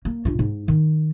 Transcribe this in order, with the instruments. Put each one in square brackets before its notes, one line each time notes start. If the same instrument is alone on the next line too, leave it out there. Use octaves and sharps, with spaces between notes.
[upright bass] A#3
G2 F4
G#2
D#3